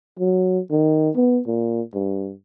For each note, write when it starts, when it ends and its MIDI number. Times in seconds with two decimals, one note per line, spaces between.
0.19 0.59 54
0.71 1.10 51
1.16 1.41 59
1.46 1.81 46
1.94 2.32 43